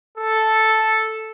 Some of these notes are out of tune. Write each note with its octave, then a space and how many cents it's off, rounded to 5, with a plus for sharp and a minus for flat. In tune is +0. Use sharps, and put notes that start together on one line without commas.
A4 +0